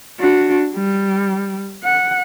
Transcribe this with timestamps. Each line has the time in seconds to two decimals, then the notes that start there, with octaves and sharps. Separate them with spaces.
0.20 D4 F#4
0.75 G3
1.84 F#5